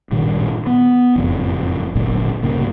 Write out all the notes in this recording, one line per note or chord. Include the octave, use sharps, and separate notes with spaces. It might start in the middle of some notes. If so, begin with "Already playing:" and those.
A1 G2 A#2 D#3
B3
F#1 F2 A2
G#1 D2 A#2 F#3
C2 G2 C#3 A#3